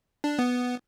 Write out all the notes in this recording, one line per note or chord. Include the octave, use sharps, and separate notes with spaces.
D4
B3